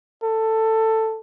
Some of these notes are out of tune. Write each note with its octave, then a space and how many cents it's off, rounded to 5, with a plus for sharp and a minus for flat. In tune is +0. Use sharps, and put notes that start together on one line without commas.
A4 +10